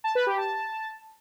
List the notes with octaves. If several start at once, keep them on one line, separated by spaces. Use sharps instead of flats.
A5
B4
G4
A5